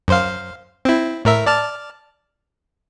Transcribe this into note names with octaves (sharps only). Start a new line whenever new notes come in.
F#2 C5 F5
C4 E4
A2 A#4 E5
D5 A5 F6